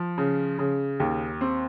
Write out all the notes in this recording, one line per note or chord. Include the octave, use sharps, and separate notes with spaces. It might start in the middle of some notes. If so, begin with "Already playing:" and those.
Already playing: F3
C#3
C#3
D#2
C4